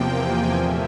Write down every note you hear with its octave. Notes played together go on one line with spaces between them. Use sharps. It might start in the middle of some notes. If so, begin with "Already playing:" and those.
Already playing: E2 C3 F3 A#3 G5
G#5
A#2 F3 A3 E5